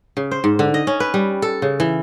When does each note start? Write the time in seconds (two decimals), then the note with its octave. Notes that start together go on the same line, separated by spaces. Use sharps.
0.17 C#3
0.31 C5
0.44 G#2
0.59 D3
0.74 D#5
0.87 C#4
1.00 B4
1.14 G3
1.42 A4
1.62 C#3
1.80 E3